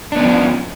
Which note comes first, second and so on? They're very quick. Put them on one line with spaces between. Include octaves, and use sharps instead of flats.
D4 B3 C#4 F3